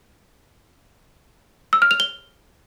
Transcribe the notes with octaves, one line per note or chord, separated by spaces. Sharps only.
E6
F6
F7
G7